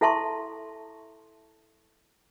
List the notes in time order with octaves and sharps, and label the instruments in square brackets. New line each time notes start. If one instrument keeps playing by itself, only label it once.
[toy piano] E4 A4 E5 A5 C6 C#6